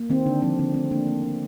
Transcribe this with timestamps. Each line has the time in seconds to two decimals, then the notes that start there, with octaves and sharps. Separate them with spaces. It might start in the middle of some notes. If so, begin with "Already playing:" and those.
Already playing: A#3
0.10 D#3 C4
0.26 D3 D4
0.42 F3 C4
0.59 D3 C4
0.74 A3 C4
0.91 A#3 D4
1.07 A#3
1.23 D#3 D4